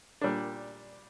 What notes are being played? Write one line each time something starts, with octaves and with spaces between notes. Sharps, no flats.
A#2 G3 D4